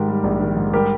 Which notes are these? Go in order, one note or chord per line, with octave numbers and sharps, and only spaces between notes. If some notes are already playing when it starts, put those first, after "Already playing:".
Already playing: G#2 D#3 G4 A#4
G3
A#1
D#3
G#2
G3 G4 A#4